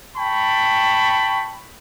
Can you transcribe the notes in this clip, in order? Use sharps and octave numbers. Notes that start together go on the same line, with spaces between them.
G5 A5 B5 C#6